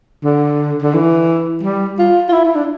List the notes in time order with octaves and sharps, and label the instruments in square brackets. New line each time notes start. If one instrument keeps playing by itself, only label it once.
[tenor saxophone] D3
D3
E3
G3
F4
F4
E4
E4
D4